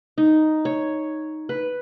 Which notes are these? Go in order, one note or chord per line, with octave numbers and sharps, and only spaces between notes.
D#4
C#5
B4